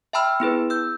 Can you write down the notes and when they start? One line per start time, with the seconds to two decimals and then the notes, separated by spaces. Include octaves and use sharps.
0.13 E5 G5 A5 B5 E6 F6
0.40 B3 E4 G#4 B4
0.70 E6 G6